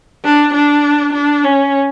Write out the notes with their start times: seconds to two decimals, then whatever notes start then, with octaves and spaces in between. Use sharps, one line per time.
0.24 D4
0.54 D4
1.14 D4
1.44 C#4